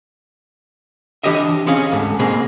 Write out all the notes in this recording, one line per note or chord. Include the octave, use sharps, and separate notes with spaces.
E3 D4 G4 C#5 D#5 E5
C4 C#4 G#4 F5
D2 G#2
B2 A#3 C4 G#4